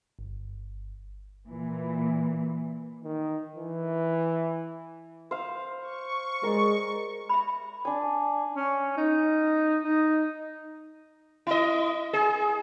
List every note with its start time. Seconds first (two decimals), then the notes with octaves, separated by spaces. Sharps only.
0.19 G1
1.47 A#2 E3
3.04 D#3
3.56 E3
5.31 C5 F5
5.81 C#6
6.43 G#3 A#4 D5
7.29 E5 B5
7.85 D4 G#5
8.56 C#4
8.97 D#4
9.84 D#4
11.47 E4 D#5
12.13 G#4